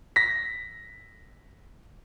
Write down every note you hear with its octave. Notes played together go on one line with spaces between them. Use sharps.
A#6 B6